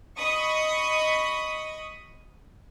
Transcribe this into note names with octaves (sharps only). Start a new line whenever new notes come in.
D#5 B5 C#6 D#6